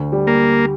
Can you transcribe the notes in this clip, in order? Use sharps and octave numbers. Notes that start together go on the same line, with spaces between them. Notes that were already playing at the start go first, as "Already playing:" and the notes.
Already playing: D2
G3
A#3